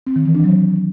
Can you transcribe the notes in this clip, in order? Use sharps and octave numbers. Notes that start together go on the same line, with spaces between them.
C4
D#3
E3
D4
F#3